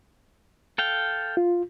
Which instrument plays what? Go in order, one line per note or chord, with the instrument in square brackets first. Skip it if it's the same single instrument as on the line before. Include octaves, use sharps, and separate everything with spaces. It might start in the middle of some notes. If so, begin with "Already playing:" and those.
[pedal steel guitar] A4 F5 G5
[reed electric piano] F4